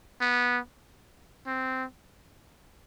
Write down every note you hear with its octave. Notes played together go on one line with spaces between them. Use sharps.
B3
C4